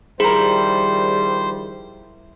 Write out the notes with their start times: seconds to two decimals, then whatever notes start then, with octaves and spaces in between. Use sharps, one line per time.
0.20 D#3 F3 G3 E4 G#4 A#4 C5